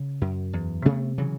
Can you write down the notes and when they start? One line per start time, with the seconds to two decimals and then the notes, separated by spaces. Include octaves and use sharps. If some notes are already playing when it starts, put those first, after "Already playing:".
Already playing: C#3
0.21 F#2
0.53 E2
0.85 C3 A3 B3
1.18 C#3 E3 F#3